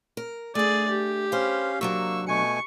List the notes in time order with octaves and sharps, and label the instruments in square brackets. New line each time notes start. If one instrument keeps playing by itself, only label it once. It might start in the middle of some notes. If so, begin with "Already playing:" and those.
[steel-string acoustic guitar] A#4
[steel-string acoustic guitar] A3 D4 [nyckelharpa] G#4 D5
[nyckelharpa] G4
[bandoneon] C#4 F5 [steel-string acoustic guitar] B4 C5
[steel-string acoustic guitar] C3 F#3 D4 [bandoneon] A#3 C#6 E6
[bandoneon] B2 A3 G#5 [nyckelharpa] C#6